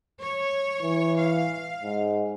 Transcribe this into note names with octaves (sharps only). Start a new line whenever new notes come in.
C#5
E3
F5
G#2